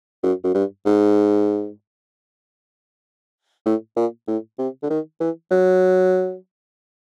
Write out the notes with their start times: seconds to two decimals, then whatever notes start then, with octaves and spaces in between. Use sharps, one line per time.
0.23 F#2
0.44 F#2
0.54 G2
0.86 G#2
3.66 A2
3.97 A#2
4.28 A2
4.59 C3
4.83 D3
4.90 D#3
5.21 E3
5.51 F#3